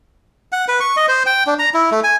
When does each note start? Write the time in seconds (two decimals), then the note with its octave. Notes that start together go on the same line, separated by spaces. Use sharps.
0.52 F#5
0.68 B4
0.80 C#6
0.97 D#5
1.08 C5
1.26 G5
1.47 D4
1.59 A#5
1.74 E4
1.91 A3
2.04 G#5